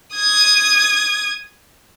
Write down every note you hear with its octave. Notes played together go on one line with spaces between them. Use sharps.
D#6 G#6